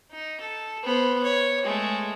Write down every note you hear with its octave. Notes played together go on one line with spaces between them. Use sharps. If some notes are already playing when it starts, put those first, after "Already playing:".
D#4
A4
B3 C5
C#5
G#3 A3